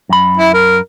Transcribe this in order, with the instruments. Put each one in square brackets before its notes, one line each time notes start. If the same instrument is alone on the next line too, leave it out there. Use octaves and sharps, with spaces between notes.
[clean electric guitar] F#2 B5
[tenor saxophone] E4
A#4